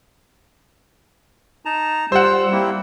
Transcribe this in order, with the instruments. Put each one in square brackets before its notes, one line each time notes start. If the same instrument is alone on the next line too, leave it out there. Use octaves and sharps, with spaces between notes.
[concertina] D#4 A5 A#5
[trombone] G3 [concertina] F4 E6 [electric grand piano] C5 F#5
[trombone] G3 [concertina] A#3 C4 E4